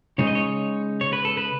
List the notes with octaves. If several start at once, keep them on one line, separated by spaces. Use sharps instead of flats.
C#3 G#3 D#4 C#5
D#5
C#5
C#5
B4
A4
B4